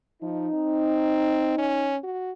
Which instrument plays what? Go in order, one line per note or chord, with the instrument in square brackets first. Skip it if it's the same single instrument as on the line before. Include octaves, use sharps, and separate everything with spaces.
[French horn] F3 [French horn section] D#4
[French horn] C4
C#4
F#4